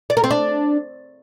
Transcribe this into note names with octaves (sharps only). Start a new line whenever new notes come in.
D5
A#4
C4
D4